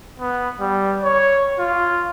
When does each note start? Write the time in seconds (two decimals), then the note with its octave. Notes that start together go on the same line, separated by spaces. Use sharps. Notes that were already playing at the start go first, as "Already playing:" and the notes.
0.20 B3
0.61 G3
1.04 C#5
1.59 F4